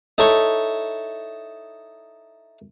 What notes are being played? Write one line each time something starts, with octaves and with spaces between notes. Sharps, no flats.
D#4 E4 A4 C#5 C#6